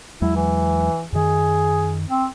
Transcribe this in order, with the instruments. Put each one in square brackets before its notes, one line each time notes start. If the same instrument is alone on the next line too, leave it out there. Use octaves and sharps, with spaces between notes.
[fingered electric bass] E2 F#3 G#3 [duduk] E4
[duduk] E3
[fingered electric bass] F#2 D#3 [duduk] G#4
[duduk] C4